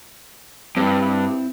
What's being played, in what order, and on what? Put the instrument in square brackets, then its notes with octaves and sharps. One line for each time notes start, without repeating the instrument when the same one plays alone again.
[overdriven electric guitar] G2 [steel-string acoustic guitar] C4 E4